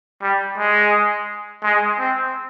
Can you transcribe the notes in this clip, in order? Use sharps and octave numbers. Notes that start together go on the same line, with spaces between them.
G3
G#3
G#3
C4